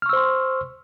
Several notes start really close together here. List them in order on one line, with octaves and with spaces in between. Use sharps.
F6 C#6 E6 C5 C6